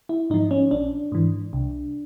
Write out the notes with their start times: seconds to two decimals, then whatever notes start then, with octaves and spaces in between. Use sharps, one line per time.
0.09 E4
0.30 G#2 F3 D#4
0.51 C#4
0.71 A#1 D4
1.12 G#2 E3
1.53 C2